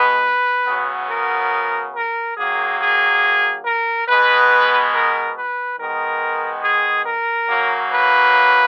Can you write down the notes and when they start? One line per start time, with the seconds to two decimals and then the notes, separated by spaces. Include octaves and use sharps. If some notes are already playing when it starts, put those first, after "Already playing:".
Already playing: B2 G#3 B3 B4
0.67 C#3 F#3 B3
1.09 A#4
1.95 A#4
2.36 D#3 F#3 A#3 G#4
2.80 G#4
3.64 A#4
4.07 B2 G#3 B3 B4
4.92 A#4
5.35 B4
5.77 D#3 G#3 B3 A#4
6.63 G#4
7.05 A#4
7.48 C#3 F#3 A#3
7.90 B4